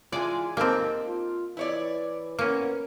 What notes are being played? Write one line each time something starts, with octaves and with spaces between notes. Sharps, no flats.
E3 G#3 F4 D5 G#5
A#3 C4 D#4 G4 A4
F4
E3 E4 C#5 D5
A#3 B3 C#4